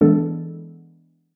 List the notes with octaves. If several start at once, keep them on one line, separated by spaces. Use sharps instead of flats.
E3 G#3 B3 D4 A4